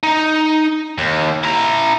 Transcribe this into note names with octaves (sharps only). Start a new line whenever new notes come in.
D#4
D#2
E4 A#5